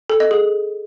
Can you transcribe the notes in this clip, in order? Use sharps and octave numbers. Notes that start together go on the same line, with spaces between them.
A4
D#5
G#4